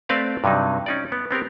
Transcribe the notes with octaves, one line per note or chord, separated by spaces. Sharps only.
A3 C4 B4 D5 F5 A5
G2 C3 F#3 D#4
C#4 D#4 D5
B3
B3 C4 G4 A#4